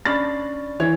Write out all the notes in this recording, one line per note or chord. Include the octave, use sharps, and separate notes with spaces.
C#4 D4 B5 A6
E3 C#5